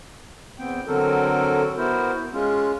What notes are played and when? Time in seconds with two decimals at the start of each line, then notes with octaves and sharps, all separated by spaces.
0.59 E2 B3 C4 G5
0.87 D3 F#3 C4 F#4 A4 A#4
1.78 B3 E4 F#4 A#4 C5
2.33 G#3 C#4 F4